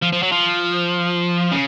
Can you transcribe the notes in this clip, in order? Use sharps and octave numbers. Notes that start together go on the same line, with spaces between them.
F3
F3
F#3
F3
C#3